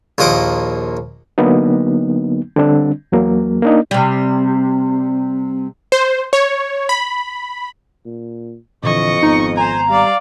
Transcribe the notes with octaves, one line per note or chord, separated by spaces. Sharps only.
A#1 D#2 A#2 D#5 F#5 D6
D3 F#3 A#3 B3 D#4
D3 G3 C4 D4
E2 F#3 A#3
A#3 D4 D#4
C3 G3
C5
C#5
B5
A#2
F2 A#2 D3 E3 D#5 C#6
G#1 B3 D#4
C5 G#5 A#5
G3 D5 F5